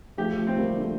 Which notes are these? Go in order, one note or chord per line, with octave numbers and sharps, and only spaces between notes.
F3 A3 G4
F3 A3
C4
G3 A#3
D3 F3 A3